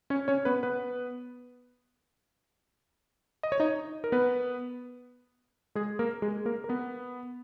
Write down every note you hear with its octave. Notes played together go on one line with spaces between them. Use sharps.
C#4 C#5
C#4 C#5
B3 B4
B3 B4
D#5
C#5
D#4 D#5
A#4
B3 B4
G#3 G#4
A#3 A#4
G#3 G#4
A#3 A#4
A#4
B3 B4